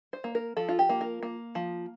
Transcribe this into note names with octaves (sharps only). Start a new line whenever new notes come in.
C5
A#3
A#4
F3 A4
F4
G4
A#3
A#4
A#3
F3